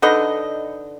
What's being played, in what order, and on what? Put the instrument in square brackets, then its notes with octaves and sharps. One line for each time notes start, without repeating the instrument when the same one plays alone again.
[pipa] D3 D#4 B4 D#5